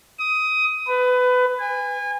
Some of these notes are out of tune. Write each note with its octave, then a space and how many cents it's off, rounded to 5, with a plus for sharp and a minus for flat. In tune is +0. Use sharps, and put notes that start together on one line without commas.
D#6 +15
B4 +20
G#5 -30